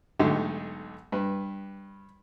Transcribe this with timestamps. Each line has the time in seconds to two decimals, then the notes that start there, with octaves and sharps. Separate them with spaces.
0.19 B1 G#2 D3 A3 G4
1.12 G2 B4